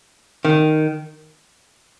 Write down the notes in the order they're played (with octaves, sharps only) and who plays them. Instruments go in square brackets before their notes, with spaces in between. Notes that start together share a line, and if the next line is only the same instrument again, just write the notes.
[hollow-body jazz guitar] D#3